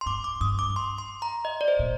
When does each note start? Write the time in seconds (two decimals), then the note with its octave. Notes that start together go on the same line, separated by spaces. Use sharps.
0.01 C6
0.06 G2 D6
0.24 D6
0.41 G2 D#6
0.59 D6
0.76 C6
0.98 C6
1.22 A#5
1.45 D#5
1.61 D5
1.68 C5
1.79 A#2